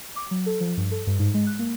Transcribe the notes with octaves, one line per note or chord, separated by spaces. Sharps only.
D6
F#3
A4
F3
G2
A4
G2
G#2
G#3
F#6
A#3